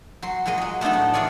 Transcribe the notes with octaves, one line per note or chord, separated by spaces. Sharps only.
F#3 C6
A#2 F#3 G#3 G#4 D#5
F#3 G#3
A3 B3 D4 D#4 A4
A2
E3 D4 F4 G#4 C#5 D5